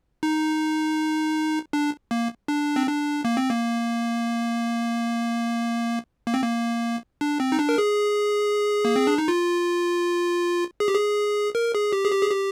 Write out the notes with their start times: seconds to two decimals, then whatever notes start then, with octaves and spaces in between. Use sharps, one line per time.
0.23 D#4
1.73 D4
2.11 A#3
2.48 D4
2.76 C4
2.87 D4
3.25 A#3
3.37 C4
3.49 A#3
6.27 A#3
6.34 C4
6.43 A#3
7.21 D4
7.40 C4
7.52 D#4
7.59 D4
7.69 A#4
7.78 G#4
8.85 A#3
8.96 C4
9.07 D4
9.18 D#4
9.28 F4
10.80 G#4
10.88 G4
10.95 G#4
11.55 A#4
11.75 G#4
11.92 G4
12.04 G#4
12.12 G4
12.22 G#4
12.30 G4